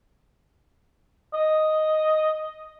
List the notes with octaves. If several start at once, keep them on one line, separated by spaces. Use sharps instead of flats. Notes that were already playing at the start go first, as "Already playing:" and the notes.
D#5